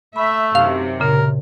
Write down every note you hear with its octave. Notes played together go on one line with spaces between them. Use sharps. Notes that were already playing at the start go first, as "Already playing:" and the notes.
A3 E5 B5
F#2 C3 D#3 F5
A#2 C#3 A#4